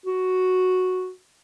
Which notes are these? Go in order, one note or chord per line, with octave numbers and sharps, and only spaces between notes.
F#4